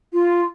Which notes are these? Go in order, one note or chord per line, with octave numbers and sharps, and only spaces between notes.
F4